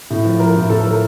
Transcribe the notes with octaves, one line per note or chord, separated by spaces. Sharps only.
A2
F3
F3 A#4
A2
A2 A4
A4
F3 A#4